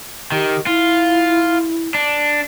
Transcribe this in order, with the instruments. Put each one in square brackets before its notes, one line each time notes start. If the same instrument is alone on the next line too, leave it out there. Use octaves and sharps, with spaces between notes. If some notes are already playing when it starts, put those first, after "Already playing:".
[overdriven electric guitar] D#3 [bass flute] G4
[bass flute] E4 [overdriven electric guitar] F4
[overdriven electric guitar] D4